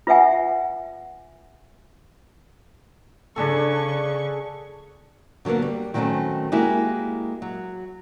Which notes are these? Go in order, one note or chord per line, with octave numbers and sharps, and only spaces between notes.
F4 B4 E5 F#5 G#5
C#3 D4 G#4 A4 C#6
D3 F#3 G#3 A#3 B3
G3
D#3 F#3 G3 A3 C4 C#4
G#3 A#3 E4 F#4 G4
F#3